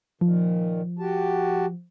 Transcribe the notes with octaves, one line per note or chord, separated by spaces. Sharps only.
A#2 D#3 F3
F#4 G4 A5